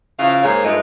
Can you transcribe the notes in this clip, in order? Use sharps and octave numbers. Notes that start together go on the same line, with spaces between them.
C#3 F3 E4 F5
G#2 D#3 A#3 G#4 C5 C#5
G2 F3 G#3 A3 D#4